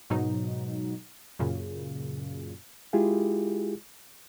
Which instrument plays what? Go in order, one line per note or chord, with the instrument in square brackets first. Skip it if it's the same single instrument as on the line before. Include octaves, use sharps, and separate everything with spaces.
[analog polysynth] G#2 B2 F#3 D#4
F#2 A#2 C#3
[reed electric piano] G#3 E4 F4 G4 G#4